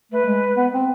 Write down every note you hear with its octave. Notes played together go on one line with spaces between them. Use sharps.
A3 B4
G#3
B3
C4